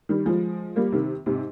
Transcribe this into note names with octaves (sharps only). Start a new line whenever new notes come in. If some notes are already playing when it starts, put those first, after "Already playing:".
D#3 G3
F3 G#3
G3 A#3
C3 D#3
G#2 C3